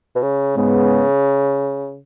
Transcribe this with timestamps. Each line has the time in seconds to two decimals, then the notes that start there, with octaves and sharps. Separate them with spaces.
0.15 B2
0.22 C#3
0.56 G#2 C#3 G#3 B3